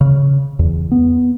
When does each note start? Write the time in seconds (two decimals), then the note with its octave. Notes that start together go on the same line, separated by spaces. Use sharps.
0.01 C#3
0.59 E2
0.91 B3